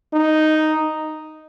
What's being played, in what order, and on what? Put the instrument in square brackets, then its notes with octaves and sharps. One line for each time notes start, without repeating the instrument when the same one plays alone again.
[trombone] D#4